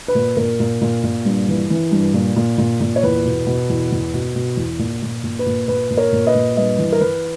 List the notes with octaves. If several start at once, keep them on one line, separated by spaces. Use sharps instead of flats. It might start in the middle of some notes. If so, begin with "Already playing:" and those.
B4
A#2
A#2 A#4
A#2
A#2
A#2
G2
E3
E3
G2
A#2
A#2
A#2
A#2
C#5
E2 B4
B2
B2
E2
E2
B2
B2
E2
A#2
A#2
A#2
B4
A#2
A#2 B4
A#2
A#4 C#5
A#2
B4 D#5
A#2
G2 B4 D#5
E3
A#4
E3 B4